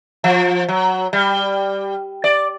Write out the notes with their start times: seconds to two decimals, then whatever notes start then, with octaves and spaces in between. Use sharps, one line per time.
0.24 F3
0.68 F#3
1.13 G3
2.24 D5